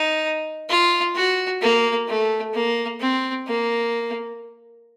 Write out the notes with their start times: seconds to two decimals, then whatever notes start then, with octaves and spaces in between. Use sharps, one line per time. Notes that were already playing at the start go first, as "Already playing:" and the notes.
Already playing: D#4
0.69 F4
1.16 F#4
1.61 A#3
2.08 A3
2.54 A#3
3.00 C4
3.47 A#3